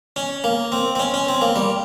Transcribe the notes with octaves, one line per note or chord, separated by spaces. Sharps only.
C#4
A#3
C4
C4
C#4
C#4
C4
A#3
G3